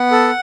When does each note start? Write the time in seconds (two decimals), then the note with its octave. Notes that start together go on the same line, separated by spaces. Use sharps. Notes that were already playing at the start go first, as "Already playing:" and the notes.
Already playing: B3 F#5
0.11 A4